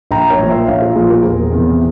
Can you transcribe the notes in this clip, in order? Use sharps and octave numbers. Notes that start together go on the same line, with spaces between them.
A#1 G5 A#5
A#4 C#5
A#2 F3
C5 E5
A#1 C#5 F5
F4 G#4
A#2 F3 F4 G#4
G4 A#4
E1 G#4 C5
E2 C3 E3